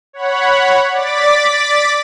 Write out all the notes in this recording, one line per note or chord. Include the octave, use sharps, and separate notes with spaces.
C#5 F#5 B5
D5 D6 A6 B6